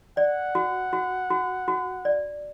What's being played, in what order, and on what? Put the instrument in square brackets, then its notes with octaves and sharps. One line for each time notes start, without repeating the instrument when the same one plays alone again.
[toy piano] D5 [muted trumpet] F#5
[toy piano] F#4
F#4
F#4
F#4
D5